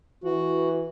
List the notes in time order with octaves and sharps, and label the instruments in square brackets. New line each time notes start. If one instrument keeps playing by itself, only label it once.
[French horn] E3 [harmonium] F#4